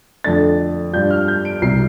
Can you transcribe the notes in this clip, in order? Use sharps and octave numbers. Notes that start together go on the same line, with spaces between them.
F2 D3 A3 D4 A6
G2 G3 F4 G6
F6
G6
D7
C2 C3 G3 C7